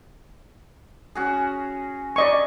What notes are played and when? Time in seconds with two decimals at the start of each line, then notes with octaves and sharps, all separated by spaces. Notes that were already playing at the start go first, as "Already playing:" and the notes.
1.15 C#4 F#4 G#4
2.16 D5 D#5 C#6